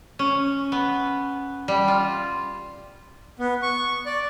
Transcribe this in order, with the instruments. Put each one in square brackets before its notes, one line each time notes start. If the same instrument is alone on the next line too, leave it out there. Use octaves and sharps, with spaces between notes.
[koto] C#4
B3
G3
F4
[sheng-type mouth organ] B3
C#6
D5